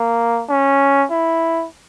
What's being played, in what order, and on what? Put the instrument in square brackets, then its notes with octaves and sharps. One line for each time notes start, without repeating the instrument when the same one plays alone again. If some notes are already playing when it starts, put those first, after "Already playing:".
Already playing: [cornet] A#3
C#4
E4